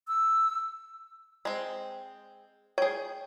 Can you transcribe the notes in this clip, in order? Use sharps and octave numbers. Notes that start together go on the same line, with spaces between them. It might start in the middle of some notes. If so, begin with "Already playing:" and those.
E6
G#3 C4
G#4 C#5 G5